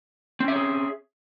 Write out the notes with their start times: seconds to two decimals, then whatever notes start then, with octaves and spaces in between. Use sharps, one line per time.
0.40 C4
0.44 C#4
0.48 E5
0.52 C#5
0.56 G#4